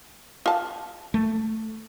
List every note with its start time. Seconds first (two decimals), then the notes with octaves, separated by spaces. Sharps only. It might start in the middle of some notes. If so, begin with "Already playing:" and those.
0.46 F4 A5
1.14 A3